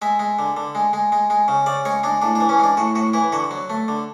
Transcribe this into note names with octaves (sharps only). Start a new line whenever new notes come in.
G#3 E5
G#3
D3
D3
G#3
G#3
G#3
G#3
C#3
C#3 D5
G#3 C#5
G#3 D4
A2 D4
D4
E3
C#4
G#3 D4
A2 F#4
A2 F#4
E3 E4
D3 F#4
F#3
A3
D3